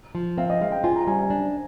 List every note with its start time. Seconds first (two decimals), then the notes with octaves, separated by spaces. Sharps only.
0.15 F3
0.38 C4 F5
0.50 D#5
0.61 G#3 F5
0.72 G5
0.84 F4 G#5
0.96 A#5
1.07 G3 G#5
1.19 G#5
1.30 D4